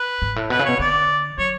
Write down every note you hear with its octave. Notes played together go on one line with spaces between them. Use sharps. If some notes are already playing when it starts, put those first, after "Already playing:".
Already playing: B4
G#2
A2
B2 B4
C#3
B2 C#5
D3 D5
F#3 C#5